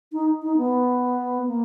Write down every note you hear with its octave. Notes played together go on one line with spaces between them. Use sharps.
D#4
D#4
B3
A#3